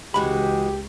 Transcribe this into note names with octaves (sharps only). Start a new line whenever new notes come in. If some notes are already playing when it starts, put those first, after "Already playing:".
C#2 E3 G#3 F#4 G4 B5